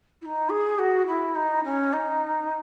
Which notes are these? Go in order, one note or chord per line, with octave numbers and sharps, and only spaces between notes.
E4
D#4
G#4
F#4
E4
D#4
C#4
D#4